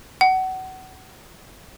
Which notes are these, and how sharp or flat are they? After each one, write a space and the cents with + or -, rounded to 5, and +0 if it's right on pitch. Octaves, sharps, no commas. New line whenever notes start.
F#5 +25